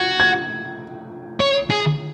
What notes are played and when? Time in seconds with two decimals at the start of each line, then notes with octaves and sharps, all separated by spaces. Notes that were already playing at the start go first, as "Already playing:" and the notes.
Already playing: F#4 G#6
0.20 G#6
1.40 C#5
1.70 G#4